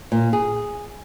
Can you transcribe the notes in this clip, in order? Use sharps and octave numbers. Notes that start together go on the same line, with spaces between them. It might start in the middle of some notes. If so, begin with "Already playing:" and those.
A#2
G#4